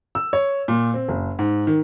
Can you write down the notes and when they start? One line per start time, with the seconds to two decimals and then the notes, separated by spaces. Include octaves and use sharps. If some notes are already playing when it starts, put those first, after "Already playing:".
0.15 E6
0.33 C#5
0.68 A#2
0.94 C4
1.09 F#1
1.39 G#2
1.67 D#3